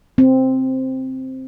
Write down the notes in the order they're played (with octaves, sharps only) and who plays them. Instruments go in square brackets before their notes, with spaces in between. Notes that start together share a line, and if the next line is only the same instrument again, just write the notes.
[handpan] C4